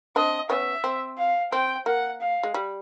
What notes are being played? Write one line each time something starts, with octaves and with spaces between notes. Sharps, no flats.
C4 D4 D#5
B3 C#4 E5
C4
F5
C4 G5
A#3 F#5
F5
G#3
G3